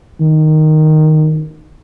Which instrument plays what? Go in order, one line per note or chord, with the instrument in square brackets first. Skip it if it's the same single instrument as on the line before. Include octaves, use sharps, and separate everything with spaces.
[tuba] D#3